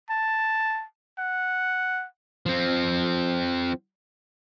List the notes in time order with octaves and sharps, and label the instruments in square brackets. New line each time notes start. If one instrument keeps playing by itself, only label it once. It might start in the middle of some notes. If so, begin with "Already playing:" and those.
[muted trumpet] A5
F#5
[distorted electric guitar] F3 C4